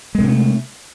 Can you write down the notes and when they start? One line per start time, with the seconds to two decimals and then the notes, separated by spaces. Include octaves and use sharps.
0.15 G#3
0.19 C3
0.24 C#4
0.29 A3